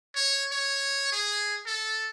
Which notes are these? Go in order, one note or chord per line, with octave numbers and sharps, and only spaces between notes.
C#5
C#5
G#4
A4